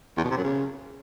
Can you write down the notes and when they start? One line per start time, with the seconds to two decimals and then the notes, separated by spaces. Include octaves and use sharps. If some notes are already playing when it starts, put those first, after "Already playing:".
0.17 E2
0.24 B2
0.31 C3
0.37 F#2
0.44 C#3